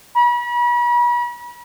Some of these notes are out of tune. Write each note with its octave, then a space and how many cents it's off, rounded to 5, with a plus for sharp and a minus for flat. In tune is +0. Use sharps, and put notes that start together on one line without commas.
B5 -40